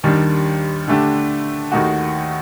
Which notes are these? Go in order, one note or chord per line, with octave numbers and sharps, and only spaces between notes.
D#2 D#3 G3 D4
D3 A3 D4 G4
D#2 D#3 A3 D#4 F#4